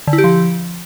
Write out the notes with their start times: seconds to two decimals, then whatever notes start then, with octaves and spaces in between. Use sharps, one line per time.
0.07 D3
0.13 E4
0.18 G4
0.24 F3